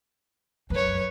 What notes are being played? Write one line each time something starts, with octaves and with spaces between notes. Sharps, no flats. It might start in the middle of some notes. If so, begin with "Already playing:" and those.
F#2 B4 C#5